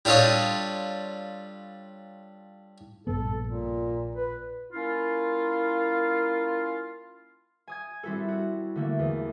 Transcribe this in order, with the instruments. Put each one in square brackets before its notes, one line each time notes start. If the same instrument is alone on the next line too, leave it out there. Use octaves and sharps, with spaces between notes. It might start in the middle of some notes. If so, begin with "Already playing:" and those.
[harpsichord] G3 D4 F4 A4 C#5 D#5
[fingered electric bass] A#1 G2 B3 [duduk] A4
[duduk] A#2
B4
[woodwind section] A#3 C#4 E4 F4
[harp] G#5 D#6 G#6
G3 C4 E4 F#4 A4
F#4
D3 A3 A#3
E2